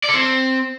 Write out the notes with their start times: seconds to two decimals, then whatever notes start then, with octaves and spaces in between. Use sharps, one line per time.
0.03 D5
0.09 A4
0.14 C4